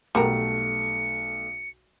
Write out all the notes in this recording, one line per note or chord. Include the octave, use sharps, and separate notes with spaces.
B1 G3 A3 F#4 A#4 C#7